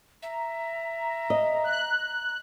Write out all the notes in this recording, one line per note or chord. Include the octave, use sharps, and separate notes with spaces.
E5 A#5
D#5
F#6